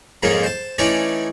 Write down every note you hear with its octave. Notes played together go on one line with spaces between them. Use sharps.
F2 G#2 D#3 G#3 A#3 C#4
C5 A5
E3 A3 C#4 D#4 C#5 D5